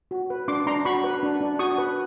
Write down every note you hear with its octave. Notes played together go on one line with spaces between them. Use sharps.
F#4
B4
D4 C6 D6
D4 A#5 C6
F#4 B5 C#6
B4
D4
D4
F#4 C#6 D#6
B4